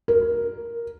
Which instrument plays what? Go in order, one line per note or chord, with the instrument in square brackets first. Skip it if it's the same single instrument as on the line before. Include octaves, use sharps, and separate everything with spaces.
[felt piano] A#4